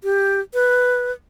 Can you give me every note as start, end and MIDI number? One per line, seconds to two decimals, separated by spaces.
0.04 0.40 67
0.54 1.12 71